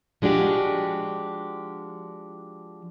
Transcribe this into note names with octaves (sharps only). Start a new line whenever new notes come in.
F3 G#3 D4 F#4 G4